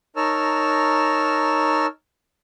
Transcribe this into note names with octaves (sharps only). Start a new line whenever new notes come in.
D#4 A#4 C#5 A5 E6 F6